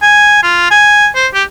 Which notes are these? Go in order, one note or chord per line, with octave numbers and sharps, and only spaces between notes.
G#5
F4
G#5
C5
G4